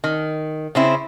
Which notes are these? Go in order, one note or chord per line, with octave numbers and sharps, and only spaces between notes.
D#3
C#3 C4 E4